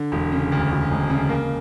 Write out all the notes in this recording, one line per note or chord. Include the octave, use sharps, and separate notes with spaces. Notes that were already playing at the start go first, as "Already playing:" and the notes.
Already playing: D3
E1
C#3
D2
E1
E1
C#3
A#3